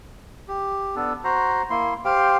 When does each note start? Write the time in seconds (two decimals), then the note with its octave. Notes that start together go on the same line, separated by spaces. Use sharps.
0.48 G4
0.96 B3 D4 A4
1.24 F#4 C5 A#5
1.70 A#3 E4 C6
2.05 G4 C5 F5 G5